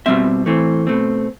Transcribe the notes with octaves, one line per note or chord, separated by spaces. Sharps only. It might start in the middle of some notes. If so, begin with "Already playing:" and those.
B2 G3 C4 E5
A2 E3 A3 C4
B2 A3 C4